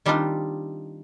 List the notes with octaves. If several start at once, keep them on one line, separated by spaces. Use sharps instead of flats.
D#3 G3 C4 D4 D#4 F4